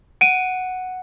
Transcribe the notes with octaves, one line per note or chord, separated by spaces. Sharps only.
F#5 D7 D#7